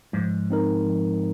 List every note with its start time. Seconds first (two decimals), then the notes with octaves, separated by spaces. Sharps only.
0.13 G#2 F3
0.50 C4 D#4 A#4
0.86 F3